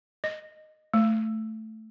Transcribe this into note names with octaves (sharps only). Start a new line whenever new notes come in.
D#5
A3